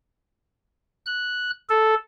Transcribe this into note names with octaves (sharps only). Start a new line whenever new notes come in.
F#6
A4